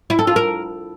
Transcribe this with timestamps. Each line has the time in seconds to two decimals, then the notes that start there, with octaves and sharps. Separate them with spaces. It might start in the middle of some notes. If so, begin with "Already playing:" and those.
0.10 E4
0.19 A4
0.27 F4
0.36 A#4